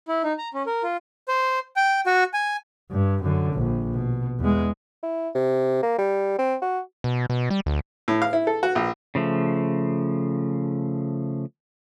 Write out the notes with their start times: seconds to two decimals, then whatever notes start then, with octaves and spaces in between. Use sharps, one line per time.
0.08 E4
0.24 D#4
0.39 A#5
0.54 C#4
0.66 A#4
0.83 F4
1.28 C5
1.76 G5
2.06 F#4
2.33 G#5
2.91 G2
3.23 F#2 D3
3.53 A#1
3.93 B2
4.39 E2 G#3
5.03 E4
5.35 C3
5.83 A#3
5.98 G3
6.39 C4
6.62 F#4
7.04 B2
7.30 B2
7.50 G3
7.66 D2
8.08 A2
8.22 F5
8.33 E4
8.47 A4
8.63 F#4
8.75 A#1
9.15 C#3 F3 A3